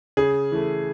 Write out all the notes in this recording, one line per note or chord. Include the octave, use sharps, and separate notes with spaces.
C#3 G#4
E3 A3